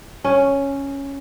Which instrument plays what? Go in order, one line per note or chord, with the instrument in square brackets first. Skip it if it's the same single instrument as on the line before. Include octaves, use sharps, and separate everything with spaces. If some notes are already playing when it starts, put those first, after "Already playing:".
[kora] C#4